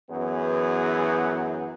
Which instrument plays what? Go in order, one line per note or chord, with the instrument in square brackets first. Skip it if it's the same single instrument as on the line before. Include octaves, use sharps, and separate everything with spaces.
[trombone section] F#2 E3 B3 G#4